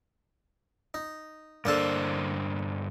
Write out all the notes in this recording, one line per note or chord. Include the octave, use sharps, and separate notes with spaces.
D#4
G2 D3 A#3 D4 A4 C5